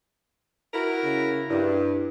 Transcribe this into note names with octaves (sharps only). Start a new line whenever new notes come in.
E4 F#4 A#4
C#3
G2 E4